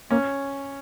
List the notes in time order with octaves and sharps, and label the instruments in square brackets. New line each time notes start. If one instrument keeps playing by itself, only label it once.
[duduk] A#3 [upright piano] C#4